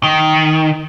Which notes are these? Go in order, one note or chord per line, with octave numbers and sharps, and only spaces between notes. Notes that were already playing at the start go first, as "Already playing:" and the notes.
D#3